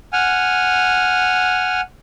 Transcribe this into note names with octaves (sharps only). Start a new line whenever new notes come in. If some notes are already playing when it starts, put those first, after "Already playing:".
F#5 G#5 F6